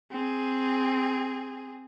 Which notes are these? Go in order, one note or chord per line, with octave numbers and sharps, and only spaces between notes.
C4 G#4